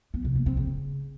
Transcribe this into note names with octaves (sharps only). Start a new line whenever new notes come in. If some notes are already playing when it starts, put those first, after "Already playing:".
B3
C3
A#3
C4
C#3